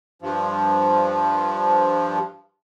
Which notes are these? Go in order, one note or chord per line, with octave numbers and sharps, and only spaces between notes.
G2 F3